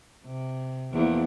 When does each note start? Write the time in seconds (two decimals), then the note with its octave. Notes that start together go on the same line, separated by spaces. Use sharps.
0.24 C3
0.92 E2 F3 A#3